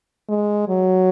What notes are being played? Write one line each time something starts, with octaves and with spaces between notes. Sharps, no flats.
G#3
F#3